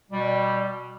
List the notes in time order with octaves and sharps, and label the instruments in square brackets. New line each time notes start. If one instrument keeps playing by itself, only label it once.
[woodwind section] B2 G3